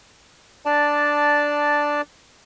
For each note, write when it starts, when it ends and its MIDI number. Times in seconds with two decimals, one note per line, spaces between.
0.65 2.01 62
0.65 2.01 74
0.65 2.01 81